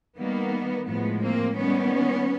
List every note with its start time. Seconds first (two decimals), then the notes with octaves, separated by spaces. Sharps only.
0.17 D#3 G3 A#3 B3
0.86 A2 F3 G#3 B3
1.21 A#3 C4
1.56 D#3 G3 A#3 B3 C#4